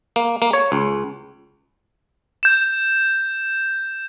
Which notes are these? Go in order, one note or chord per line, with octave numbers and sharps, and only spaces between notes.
A#3
A#3
C#5
C#2
G6 E7